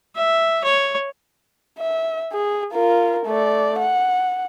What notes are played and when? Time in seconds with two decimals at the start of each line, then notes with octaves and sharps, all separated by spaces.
0.16 E5
0.64 C#5
1.79 E5
2.33 G#4
2.74 F4 A#4
3.26 A3 D5
3.79 F#5